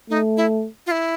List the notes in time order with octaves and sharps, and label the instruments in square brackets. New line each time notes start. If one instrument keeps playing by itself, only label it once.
[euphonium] A3 [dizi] D#4
[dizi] E4
F4
E4